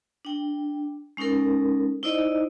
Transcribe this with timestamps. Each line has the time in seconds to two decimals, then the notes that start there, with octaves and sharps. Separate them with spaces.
0.25 D4 G5
1.17 G#3 C#4 D#4 A4 A#4
2.03 D#4 E4 C5 D5 D#5